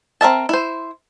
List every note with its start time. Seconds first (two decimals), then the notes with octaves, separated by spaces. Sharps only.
0.21 C4 A#4 E5 A5
0.49 E4 C5